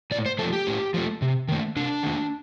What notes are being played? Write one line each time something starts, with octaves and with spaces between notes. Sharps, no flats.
A2 D5
C5
F3 A3 A4
G4
A2
F3 A3
C3
D#3 A3
C3 D4
D#3 A3